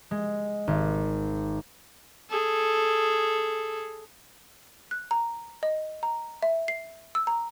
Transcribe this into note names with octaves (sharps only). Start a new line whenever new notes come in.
G#3
G#1
G#4 A4
F#6
A#5
D#5
A#5
E5
C7
E6
A#5